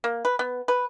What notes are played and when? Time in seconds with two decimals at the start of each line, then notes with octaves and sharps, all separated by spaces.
0.04 A#3
0.25 B4
0.39 B3
0.68 B4